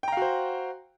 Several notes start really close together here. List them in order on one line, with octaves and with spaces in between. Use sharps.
G5 A#5 F5 F#4 C5